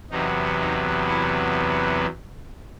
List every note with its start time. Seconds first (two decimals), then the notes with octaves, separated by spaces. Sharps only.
0.10 E2 C3 F#3 B3 D#4
0.59 D#4
1.08 E4